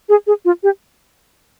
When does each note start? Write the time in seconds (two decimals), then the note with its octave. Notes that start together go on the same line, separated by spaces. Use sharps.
0.09 G#4
0.27 G#4
0.45 F4
0.63 G4